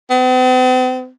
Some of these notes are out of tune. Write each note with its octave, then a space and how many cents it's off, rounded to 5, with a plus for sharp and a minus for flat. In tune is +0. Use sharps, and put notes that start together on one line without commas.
C4 -45